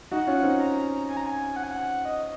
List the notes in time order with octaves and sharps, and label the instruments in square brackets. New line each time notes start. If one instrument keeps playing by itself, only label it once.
[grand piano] D#4 F#4 [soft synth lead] F#5
[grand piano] C#4 F4
C4 D#4
[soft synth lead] A#5
G#5
A#5
G#5
F#5
G#5
F#5
D#5